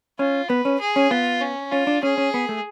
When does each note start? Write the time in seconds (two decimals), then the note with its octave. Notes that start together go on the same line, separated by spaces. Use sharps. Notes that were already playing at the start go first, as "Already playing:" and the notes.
0.19 C#4 F4
0.49 B3 B4
0.65 C#4
0.80 G#4
0.96 C#4
1.11 B3 F4
1.41 C#4
1.72 C#4 F4
1.87 D4
2.03 C#4 G#4
2.18 C#4
2.34 B3
2.49 A3